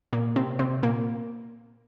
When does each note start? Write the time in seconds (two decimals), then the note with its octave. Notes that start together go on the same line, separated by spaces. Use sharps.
0.13 A#2 A#3
0.36 C3 C4
0.59 C3 C4
0.83 A#2 A#3